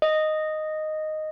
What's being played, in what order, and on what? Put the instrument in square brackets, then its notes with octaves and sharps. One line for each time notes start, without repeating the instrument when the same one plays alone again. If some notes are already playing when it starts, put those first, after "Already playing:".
[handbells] D#5